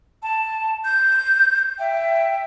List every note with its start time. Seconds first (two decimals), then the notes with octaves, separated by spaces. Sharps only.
0.24 A5
0.86 G6
1.79 E5 G5